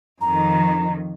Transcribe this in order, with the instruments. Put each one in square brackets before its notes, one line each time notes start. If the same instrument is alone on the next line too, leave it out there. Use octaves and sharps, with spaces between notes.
[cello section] F2 D#3 [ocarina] A#5